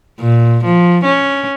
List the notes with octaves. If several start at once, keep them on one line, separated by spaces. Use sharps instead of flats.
A#2
F3
C#4